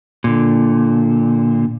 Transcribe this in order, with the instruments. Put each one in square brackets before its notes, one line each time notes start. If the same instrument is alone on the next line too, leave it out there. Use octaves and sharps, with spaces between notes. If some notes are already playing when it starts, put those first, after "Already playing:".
[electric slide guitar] A#2 D3